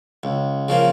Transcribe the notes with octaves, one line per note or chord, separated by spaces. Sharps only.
C#2
C#3 F3 A#3